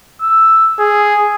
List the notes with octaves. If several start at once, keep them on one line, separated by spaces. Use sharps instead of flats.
E6
G#4